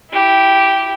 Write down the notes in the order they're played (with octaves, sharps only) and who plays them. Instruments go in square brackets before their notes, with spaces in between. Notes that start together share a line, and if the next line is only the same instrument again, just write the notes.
[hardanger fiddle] E4 G4